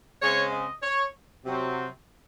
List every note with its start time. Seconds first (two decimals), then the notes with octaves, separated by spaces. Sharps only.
0.21 C#3 G#3 C4 C#5
0.52 D#5
0.83 C#5
1.44 C3 F#3 C4